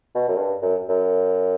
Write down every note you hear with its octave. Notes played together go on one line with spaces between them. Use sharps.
B2
F#2
G2
F#2
F#2